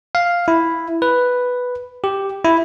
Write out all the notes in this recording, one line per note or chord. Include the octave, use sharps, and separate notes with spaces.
F5
E4
B4
G4
E4